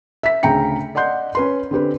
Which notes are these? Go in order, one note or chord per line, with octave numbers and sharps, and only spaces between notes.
E5 B6
D2 C#3 G5 A#5 C#7
D5 D#5 F#5 C6 G6
C#4 B4 C6
D3 C4 G4 B4